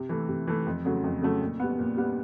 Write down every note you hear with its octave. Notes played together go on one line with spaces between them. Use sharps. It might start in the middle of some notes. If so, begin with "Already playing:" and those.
Already playing: C3
E3 A3
C3
E3 A3
F2
C#3 F#3 A3
F2
C#3 F#3 A3
A#2
G3 B3
A#2
G3 B3